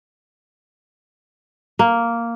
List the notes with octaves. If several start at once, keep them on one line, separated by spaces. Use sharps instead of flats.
A#3